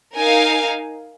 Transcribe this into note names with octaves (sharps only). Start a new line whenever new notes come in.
D#4 A#4 F5 G#5